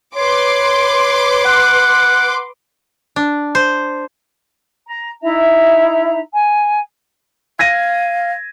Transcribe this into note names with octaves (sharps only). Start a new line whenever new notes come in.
B4 C#5 C6 D6
F#5
D4
C5
A#5
D#4 E4 E5 A#5
G#5
F5 G#6 A#6 D#7